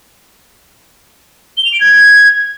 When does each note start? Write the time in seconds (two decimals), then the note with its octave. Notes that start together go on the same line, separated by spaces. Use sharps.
1.57 G7
1.65 F7
1.73 D7
1.80 G#6